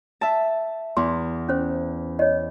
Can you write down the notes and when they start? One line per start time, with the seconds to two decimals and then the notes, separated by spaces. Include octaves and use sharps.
0.21 E5 A5
0.97 E2 C6
1.48 C#4 C5
2.19 C#5 D#5